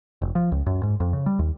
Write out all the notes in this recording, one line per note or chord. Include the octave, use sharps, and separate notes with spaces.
F1
F3
C#2
F#2
G#2
F2
C#3
G3
D#2